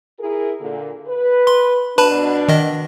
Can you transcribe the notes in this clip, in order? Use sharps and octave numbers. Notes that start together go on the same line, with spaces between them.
E4 G#4 A#4
A#2 D3
B4
C6
B2 D4 B4 A5 B5
D#3 D#5